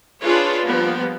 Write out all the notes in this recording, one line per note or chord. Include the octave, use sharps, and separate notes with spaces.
D4 F4 G#4 B4 C#5
F3 G3 A#3 B3